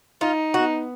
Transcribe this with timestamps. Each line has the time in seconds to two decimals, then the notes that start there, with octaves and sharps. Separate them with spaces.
0.21 D#4 F4
0.54 B3 F#4